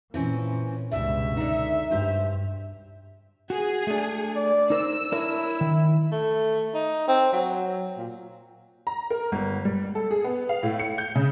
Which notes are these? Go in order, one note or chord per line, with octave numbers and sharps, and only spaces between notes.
A#2 E3 C4 C#4
C#2 G2 B2 E5
D3 D#4
G2 G4 C5
F#4 G#4
A3 D4
D5
D#4 A#4 C5 E6
D4 E4 A#4 C#5
D#3
A3
D#4
C4
F#3
A#2
A#5
A#4
G1
G3
A4
G#4
B3
F5
A2
C#7
G6
C#3